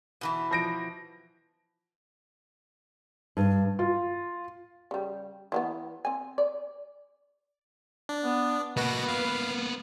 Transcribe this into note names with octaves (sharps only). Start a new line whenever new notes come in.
B2 E3 E4
F3 A#6 D7
G2
F4
C#3 G3
E3 F#3 B3
C4 G#5
D5
D4
B3
B2 A#3 B3 F#4 B4 A#6
F5